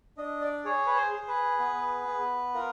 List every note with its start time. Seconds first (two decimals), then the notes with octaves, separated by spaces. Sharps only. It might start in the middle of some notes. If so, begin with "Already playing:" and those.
0.17 D4 D#5
0.41 D5
0.64 G#4 C#5
0.86 B4
0.96 C5
1.12 G#4
1.28 B4
1.59 B3
2.07 B3
2.54 F4 A#4